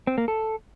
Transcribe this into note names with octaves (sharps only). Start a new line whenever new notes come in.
C4
A#3
A4